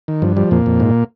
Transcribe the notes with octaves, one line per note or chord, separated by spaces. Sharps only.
D#3
G2 F3
F3 G3
F2 A#2 A#3
F2
G#2